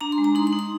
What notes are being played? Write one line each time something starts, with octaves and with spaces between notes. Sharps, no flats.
D4 A#5
C6
G#3
A#5
D#4 C6
C6
D#4
C6